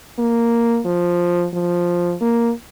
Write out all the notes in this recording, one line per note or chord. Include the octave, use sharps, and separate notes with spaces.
A#3
F3
F3
A#3